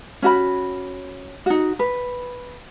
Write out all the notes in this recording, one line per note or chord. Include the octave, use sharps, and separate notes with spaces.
C#4 F#4 B5
D#4 F#4
B4